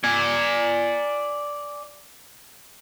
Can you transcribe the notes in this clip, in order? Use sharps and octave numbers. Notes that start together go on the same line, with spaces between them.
D5 G#5